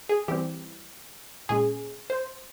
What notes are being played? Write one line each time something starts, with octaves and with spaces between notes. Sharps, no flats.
G#4
E3 G3 C4 G4
A#2 G#3 C#4 G#4
C5